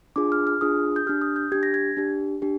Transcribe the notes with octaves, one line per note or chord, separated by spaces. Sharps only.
D4 F4 G#4 D6
F6
F6
D4 F4 G#4 D#6
G6
D4 G4 F6
D#6
G6
D4 G4 G#6
A#6
G#6
D4 G4
D4 G4